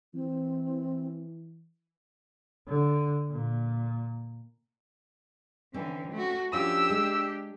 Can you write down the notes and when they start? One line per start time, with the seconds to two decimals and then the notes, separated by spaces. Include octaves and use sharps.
0.14 E3 C4
2.68 D3
3.32 A#2
5.74 D3 E3 C4 C#4
6.12 A3 F#4
6.53 F3 C#4 D4 F4 G4 E6
6.90 G#3